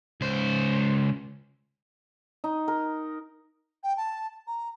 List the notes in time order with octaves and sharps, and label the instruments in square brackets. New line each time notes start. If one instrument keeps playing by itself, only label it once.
[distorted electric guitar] C#2 C5
[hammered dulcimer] D#4
A#4
[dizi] G5
A5
A#5